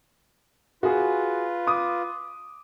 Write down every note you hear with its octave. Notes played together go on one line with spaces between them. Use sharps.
F4 F#4 G#4 B4
D6 D#6